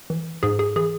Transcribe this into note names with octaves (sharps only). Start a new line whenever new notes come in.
E3
G#2 G#4
G#4
E3 G#4